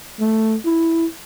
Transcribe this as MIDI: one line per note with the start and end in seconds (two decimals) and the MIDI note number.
0.20 0.55 57
0.66 1.05 64